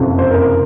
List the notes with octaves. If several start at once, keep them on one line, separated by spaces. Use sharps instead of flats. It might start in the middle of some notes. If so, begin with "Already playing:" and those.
Already playing: F#1 F2 C3 F3
C5
A#4